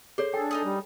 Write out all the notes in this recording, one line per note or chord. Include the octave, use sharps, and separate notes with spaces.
G#4 A4 C5 C#5
D4 G#4 A4 G5
D#4 G#5 D#6
G3